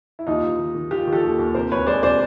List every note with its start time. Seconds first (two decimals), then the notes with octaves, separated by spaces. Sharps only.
0.19 E4
0.27 D#2 D#4 F4
0.43 D#2
0.59 D#3
0.75 D#3
0.91 D#3 F4 G4
1.07 D#3
1.13 G4 A4
1.23 D#2
1.39 D#2
1.55 C3 A#4 C5
1.72 D2 B4 C#5
1.87 G#3 C5 D5
2.03 C3 C5 D5